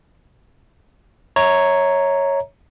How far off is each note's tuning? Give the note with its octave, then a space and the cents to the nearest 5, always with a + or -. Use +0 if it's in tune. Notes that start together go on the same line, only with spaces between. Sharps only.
C#5 +0 E5 -35 A#5 +0